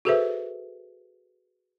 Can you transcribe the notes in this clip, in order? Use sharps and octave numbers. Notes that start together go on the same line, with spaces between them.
F#4 G#4 A4 B4 C5 E5